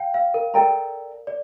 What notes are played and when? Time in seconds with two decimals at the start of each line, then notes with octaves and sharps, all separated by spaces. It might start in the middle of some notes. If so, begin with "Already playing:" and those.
Already playing: F5 G5
0.14 F5
0.34 A#4
0.54 A4 A#4 D5 G5 A#5
1.27 D5